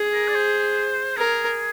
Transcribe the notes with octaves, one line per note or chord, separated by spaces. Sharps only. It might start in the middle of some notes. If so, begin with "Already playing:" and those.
Already playing: G#4
A#4
D5
C5
G#4 A#4